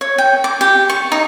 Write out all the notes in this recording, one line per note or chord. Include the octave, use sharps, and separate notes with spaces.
C#5
G5
D6
G4
C#6
D#4